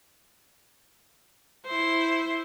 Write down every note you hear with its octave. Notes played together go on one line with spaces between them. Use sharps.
E4 C5